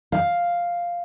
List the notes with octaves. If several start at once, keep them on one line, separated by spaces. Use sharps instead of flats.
F5